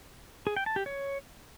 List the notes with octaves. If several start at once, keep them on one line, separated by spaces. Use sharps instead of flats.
G#4
G5
A5
G4
C#5